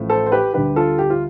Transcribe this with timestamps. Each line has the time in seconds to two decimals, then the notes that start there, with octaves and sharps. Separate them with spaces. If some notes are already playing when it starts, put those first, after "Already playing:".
Already playing: A1 A2 F3 A3
0.10 A4 C5
0.26 C5
0.32 G4 B4
0.54 D2 D3 G3 G4 B4
0.76 F4 A4
0.98 G4
1.10 F4